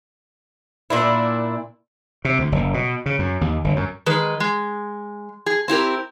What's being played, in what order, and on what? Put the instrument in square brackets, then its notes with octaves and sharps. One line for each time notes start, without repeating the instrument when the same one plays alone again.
[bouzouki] A#2 D4 E4
[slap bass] C3
D2
F#1
B2
C#3
F#2
D#2
G1
F#2
[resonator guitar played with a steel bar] D#3 G#3 B4
G#3
G#4
C4 E4 G4 A#4